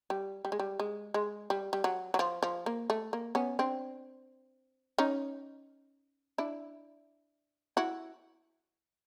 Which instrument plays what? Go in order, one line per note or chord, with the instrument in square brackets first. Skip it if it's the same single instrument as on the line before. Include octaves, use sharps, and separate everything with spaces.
[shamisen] G3
G3
G#3
G3
G#3
G#3
G3
G3
F#3
F#3
F3
F3
A#3
A3
A#3
B3 C#4
C4 D4
C#4 D#4
D4 E4
E4 F#4